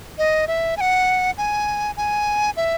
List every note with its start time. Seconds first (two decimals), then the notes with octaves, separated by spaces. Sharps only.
0.18 D#5
0.48 E5
0.77 G#5
0.81 F#5
1.38 G#5
1.97 G#5
2.57 E5